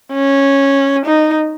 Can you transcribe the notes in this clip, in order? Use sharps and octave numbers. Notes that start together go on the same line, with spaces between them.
C#4
D#4